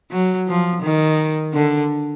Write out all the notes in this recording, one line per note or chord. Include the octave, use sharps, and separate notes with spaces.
F#3
F3
D#3
D3